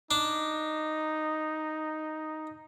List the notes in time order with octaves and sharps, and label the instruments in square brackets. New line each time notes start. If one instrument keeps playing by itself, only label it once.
[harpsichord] D4 [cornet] D#4